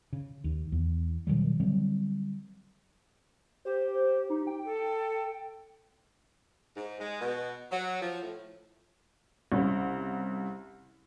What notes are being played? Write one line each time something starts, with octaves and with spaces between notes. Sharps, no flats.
C#3
D#2
E2
B2 D#3 F#3 G3
D3 F#3 G3 C4
G4 C5
D#4
G5
A4
G#2
G#3
B2
F#3
F3
A2
C2 C#3